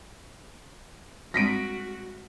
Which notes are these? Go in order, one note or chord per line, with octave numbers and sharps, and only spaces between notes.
G3 G#3 C4 F#4 A#6 B6 D7